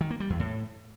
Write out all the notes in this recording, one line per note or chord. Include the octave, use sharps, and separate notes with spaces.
D#3
A#3
G3
E2
A2